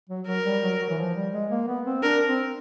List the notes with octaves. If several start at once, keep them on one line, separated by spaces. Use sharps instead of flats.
F#3
F#3 A#4
G3
F#3
F#3
E3
F3
G3
G#3
A#3
B3
C4
D4 A#4
C4